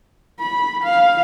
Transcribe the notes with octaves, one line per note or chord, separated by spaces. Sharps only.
B5
F5